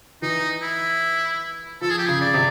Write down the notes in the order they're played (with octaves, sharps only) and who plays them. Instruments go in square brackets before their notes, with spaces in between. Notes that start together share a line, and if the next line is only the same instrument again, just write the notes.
[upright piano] E3 [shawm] D#4
[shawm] E4
[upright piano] F3 [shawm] A4
[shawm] G#4
G4
[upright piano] C#3 [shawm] G#4
[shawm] D5
[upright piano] C3